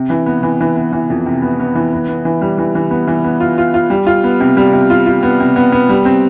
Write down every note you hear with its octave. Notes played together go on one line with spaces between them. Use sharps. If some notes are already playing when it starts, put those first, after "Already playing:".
Already playing: C3
E3
B3
E3
E3
B3
E3
F2
C3
B3
B3
E3
B3
B3
E3
G3
E3
E3
B3
E3
B3
F4
F4
F4
G3
F4
B3
C3
G3
C3
F4
F4
B3
C3
B3
B3
G3
C4